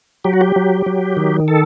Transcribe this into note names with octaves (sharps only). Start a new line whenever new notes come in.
F#3 G4
F#4
G4
F#3
F#3
D#3
A4